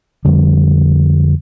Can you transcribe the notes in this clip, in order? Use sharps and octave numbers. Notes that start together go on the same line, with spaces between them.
F2 D3 G3